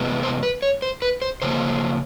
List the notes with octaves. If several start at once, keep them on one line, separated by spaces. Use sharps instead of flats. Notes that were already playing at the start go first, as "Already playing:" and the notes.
Already playing: C3 E3 G#3 B3
C5
B4
C#5
C5
B4
C5
C#3 F3 A#3 C5